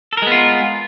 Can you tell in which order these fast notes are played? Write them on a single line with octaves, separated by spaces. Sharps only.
A4 A#4 G#3 B3 F4